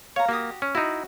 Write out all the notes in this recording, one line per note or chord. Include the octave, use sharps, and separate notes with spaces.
C#5 F5 A#5
A#3 F#4 G4 D#6
C#4
D#4 E4 F#4